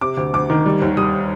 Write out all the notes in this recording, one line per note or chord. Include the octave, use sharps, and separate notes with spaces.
C3 D6
D2
D2 D6
D#3
G3
D#2
G3 D#6